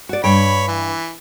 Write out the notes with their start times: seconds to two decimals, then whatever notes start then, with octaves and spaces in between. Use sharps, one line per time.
0.09 F#4 D5
0.24 G2 C#5 G5 B5
0.68 E3